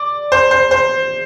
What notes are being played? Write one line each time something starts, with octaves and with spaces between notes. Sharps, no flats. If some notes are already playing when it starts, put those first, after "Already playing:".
Already playing: D5
C5
C5
C5